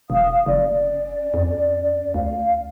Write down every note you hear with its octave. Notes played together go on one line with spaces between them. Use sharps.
E1 F5 D#6
F#1 C#4 D5
F2
D2 F5